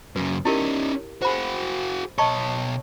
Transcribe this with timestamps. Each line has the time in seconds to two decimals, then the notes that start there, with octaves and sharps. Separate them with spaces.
0.16 F#2 C#3 B4
0.45 C#4 D#4 E4 G4 A#4
1.22 F#4 G#4 C5 B5
2.18 B2 C#5 D#5 A5 C#6